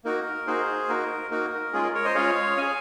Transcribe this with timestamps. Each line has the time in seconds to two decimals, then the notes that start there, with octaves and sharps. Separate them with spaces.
0.05 A#3 D#4 F#4 A#4
0.47 A#3 D#4 F#4 G#4 C5
0.89 A#3 D#4 F#4 A#4
1.31 A#3 D#4 F#4 A#4
1.73 G#3 C#4 F4 G#4
1.83 A#4
1.94 A#4 C#5
2.05 C5 D#5
2.15 G#3 C#4 F4 G#4 C#5 F5
2.57 C#4 G#4 F5 G#5